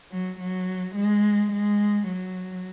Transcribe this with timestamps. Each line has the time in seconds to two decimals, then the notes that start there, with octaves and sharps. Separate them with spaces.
0.12 F#3
0.40 F#3
0.96 G#3
1.52 G#3
2.07 F#3